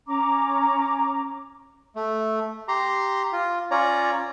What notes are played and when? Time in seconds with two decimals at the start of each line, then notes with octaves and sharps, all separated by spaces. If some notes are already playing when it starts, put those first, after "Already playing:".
0.07 C#4 A#5 D6
1.96 A3
2.68 G4 A#5 C6
3.33 F4
3.71 C#4 F4 C#5 D5 A#5